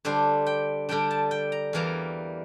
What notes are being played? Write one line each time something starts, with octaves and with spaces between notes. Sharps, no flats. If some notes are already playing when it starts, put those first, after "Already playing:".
D3 G3 D4 C5
G5
D3 G3 D4 G5
A5
G5
A#5
E2 E3 G3 A#3 A#5